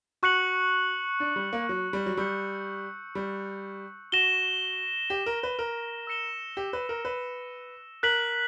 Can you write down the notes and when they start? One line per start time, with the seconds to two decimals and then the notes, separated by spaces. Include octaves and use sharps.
0.23 F#4 C#6 F#6 C#7 F#7
1.20 D4
1.36 G3
1.53 A#3
1.69 F#3
1.93 G3
2.06 F#3
2.17 G3 E6 G6 C#7
3.15 G3
4.12 F#4 A#6 E7 G7
5.10 G4
5.26 A#4
5.43 B4
5.59 A#4
6.07 E6 A#6 C#7 E7 G7
6.57 G4
6.73 B4
6.89 A#4
7.05 B4
8.03 A#4 F#6 B6 F#7